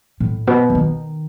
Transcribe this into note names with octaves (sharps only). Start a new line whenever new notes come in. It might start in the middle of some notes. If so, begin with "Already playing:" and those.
A2
B2
E3
D#3